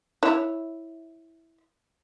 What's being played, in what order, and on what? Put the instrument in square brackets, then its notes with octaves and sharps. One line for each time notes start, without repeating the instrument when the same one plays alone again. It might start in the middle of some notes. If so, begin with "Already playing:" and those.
[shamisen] E4 C#5